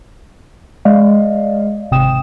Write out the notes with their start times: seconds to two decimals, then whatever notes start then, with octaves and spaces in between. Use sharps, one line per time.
0.85 G#3 D5 D#5 F5
1.91 G#1 C3 G5 D#6 E7